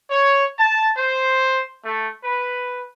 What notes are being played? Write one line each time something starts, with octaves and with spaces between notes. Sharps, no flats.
C#5
A5
C5
A3
B4